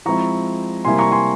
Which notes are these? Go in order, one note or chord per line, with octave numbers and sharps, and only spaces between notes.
F3 G#3 C4 E4 A#5 C#6
C3 G3 A#3 E4 G#5 C6
A#5 C#6
G#5 C6